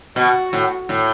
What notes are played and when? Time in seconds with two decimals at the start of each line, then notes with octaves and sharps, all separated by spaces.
0.16 B2 F#4
0.53 A2
0.89 A2